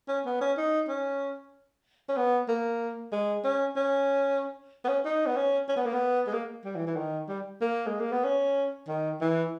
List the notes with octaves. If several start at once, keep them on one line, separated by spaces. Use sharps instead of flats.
C#4
B3
C#4
D#4
C#4
C#4
B3
A#3
G#3
C#4
C#4
B3
C#4
D#4
B3
C#4
C#4
B3
A#3
B3
G#3
A#3
G3
E3
E3
D#3
G3
A#3
G#3
A#3
B3
C#4
D#3
E3